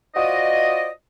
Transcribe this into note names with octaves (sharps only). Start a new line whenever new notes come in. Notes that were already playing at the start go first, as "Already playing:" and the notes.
F4 F#4 C5 D5 D#5